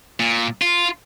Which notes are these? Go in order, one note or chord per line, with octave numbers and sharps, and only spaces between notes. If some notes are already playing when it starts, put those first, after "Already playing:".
A#2
F4